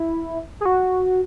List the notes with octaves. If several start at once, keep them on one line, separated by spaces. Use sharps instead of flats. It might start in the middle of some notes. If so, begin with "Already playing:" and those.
Already playing: E4
G#4
F#4